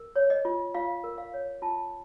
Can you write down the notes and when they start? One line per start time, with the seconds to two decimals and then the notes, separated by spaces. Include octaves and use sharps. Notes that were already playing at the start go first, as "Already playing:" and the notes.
Already playing: A#4
0.16 C#5
0.30 D#5
0.45 F4
0.74 F4 F5
1.04 A#4
1.18 F5
1.33 C#5
1.62 F4 A5